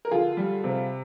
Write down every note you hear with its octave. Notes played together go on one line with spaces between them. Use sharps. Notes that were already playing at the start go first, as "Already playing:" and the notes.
A#4
D3 F4 G#4
G3
C3